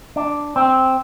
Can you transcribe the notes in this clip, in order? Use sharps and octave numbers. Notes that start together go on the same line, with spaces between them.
D4
C4